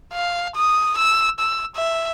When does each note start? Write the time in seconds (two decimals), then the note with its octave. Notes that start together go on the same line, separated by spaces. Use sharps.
0.13 F5
0.56 D#6
0.97 E6
1.39 E6
1.76 E5